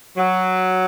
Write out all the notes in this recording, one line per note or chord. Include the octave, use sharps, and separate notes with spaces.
F#3